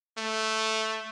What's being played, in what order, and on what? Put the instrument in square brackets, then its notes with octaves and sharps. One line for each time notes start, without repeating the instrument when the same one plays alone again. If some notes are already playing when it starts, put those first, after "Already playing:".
[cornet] A3